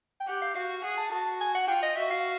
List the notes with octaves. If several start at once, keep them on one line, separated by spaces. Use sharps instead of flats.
G5
G4 F#5
F5
F#4 F5
G#4 F#5
A5
F#4 A5
G#5
F#5
F4 G5
D#5
F#4 E5
F5